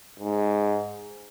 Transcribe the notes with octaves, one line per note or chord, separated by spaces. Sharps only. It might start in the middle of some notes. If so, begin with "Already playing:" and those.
G#2